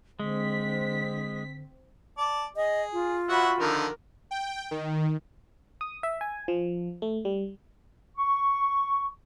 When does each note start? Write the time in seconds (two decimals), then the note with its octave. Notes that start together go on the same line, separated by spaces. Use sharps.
0.19 D3 G#3 C4 B6
2.18 D5 A5
2.56 G#4 D#5
2.93 F4
3.29 F#4 C#5 E5 F#5 B5
3.60 D3 D#3 F3 A#4
4.31 G5
4.71 D#3
5.81 D#6
6.03 E5
6.21 G#5
6.48 F3
7.02 A3
7.25 G3
8.17 C#6